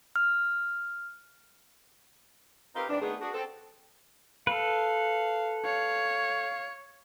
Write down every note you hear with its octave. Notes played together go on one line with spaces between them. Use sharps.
F6
C4 D#4 F4 G4 A#4 B4
G#2 E3 C4 D4
D#3 A3 B3 C4 G#4
D4 F#4 G#4
C4 A4
A4 B4 F5
C#5 F5